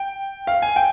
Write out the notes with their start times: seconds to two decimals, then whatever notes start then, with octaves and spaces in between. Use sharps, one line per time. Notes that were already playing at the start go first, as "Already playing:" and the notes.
Already playing: G5
0.47 F5
0.62 G#5
0.76 G5